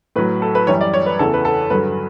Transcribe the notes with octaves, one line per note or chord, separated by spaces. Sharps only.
A2 F#3 B4
A4
B4
F#2 E3 G3 C#5
D5
C#5
B4
E2 C#3 E3 A4
B4
A4
G2 D3 F#3 B4